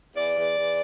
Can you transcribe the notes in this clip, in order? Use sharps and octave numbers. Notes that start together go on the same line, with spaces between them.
E2 D5
E2
E2